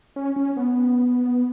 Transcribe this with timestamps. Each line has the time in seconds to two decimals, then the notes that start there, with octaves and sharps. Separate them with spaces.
0.16 C#4
0.36 C#4
0.57 B3